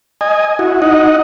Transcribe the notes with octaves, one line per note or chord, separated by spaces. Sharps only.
D#5 G#5
E4 F#4
D#4 D#5 F#5